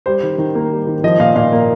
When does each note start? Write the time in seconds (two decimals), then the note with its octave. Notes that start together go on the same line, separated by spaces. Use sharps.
0.06 G3 C5
0.23 D#3
0.38 D#3
0.55 A#3
0.72 G3
0.87 D#3
1.04 F3 D#5
1.19 A#2 F5
1.35 A#2 F5
1.52 A#3